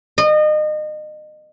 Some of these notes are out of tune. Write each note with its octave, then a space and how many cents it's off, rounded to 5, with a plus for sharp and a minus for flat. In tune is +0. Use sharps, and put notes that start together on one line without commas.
D#5 -30